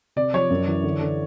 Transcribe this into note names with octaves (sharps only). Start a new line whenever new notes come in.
C3 D5
F3 C#5
F#2
E3
D3
D3